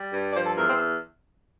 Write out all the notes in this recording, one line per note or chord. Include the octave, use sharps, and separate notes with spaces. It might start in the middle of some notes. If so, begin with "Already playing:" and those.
Already playing: G3
G2
D5
F3 C5
A4
E2 A#4
C4